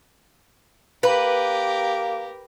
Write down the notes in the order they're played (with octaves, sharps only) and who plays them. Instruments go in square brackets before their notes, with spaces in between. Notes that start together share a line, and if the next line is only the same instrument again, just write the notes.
[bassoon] A#3 [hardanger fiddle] G4 A#4 [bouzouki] B4